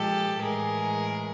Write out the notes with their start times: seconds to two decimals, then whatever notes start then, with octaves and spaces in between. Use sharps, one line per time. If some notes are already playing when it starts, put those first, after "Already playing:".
Already playing: A#2 F3 G#3 G4 A4
0.42 A2 E3 G#3 G#4 A#4